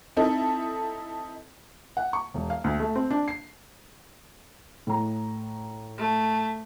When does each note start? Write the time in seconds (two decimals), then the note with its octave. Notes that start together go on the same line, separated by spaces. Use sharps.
0.17 C4 D#4 E4 A4
1.97 F#5
2.13 C#6
2.34 E1
2.50 F5
2.64 D2
2.80 A3
2.96 C4
3.11 D4
3.28 C7
4.87 A2 A#5
5.98 A3